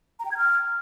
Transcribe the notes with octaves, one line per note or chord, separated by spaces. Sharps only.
A#5
G5
G#6
F6